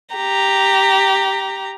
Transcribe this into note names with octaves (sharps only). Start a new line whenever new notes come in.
G4 A#5